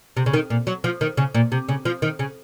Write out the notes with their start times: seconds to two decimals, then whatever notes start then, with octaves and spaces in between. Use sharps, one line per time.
0.17 C3
0.26 C#3
0.33 D#3
0.50 A#2
0.67 F#3
0.84 F3
1.01 D#3
1.17 C#3
1.34 A#2
1.52 C3
1.69 C#3
1.85 F3
2.02 D#3
2.19 C#3